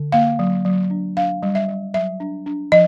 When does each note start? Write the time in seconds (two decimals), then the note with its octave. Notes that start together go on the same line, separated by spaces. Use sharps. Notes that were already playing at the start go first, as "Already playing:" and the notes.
Already playing: D3
0.12 A#3 F5
0.39 F#3
0.65 F#3
0.90 D4
1.16 D4 F5
1.43 G3
1.55 E5
1.68 G3
1.94 F#3 E5
2.20 D4
2.46 D4
2.72 F3 D#5